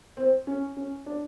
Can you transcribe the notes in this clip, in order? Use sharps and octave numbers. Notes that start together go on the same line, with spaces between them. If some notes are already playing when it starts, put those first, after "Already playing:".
C4
C#4
C#4
D4